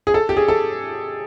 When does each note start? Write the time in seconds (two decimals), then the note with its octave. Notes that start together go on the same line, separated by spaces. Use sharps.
0.07 G#4
0.14 A4
0.29 G4
0.37 G#4
0.48 A4